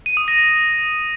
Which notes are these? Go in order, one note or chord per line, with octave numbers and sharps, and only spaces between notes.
D#7
D#6
A#6